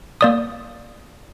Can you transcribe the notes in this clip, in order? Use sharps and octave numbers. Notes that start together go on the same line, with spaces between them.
A#3 D5 D#6